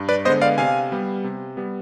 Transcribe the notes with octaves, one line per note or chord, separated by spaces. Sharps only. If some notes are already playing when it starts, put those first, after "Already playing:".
Already playing: G2
B4 D5
D3 G#3 B3 C5 D#5
D5 F5
C3 F5 G#5
G3 B3
C3
G3 B3